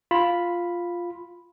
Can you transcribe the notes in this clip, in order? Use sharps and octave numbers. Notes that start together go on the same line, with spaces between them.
F4 B5